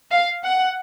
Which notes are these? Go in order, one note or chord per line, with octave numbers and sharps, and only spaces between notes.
F5
F#5